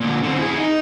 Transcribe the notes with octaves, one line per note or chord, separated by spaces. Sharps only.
A#2 D3
D3 C4
E4 G#4
D#4